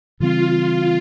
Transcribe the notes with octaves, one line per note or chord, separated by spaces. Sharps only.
C#3 E3 G3 C4 F4